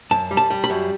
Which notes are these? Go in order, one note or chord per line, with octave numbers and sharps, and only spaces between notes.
F#2 A5
G3
A5
G3
B5
F#2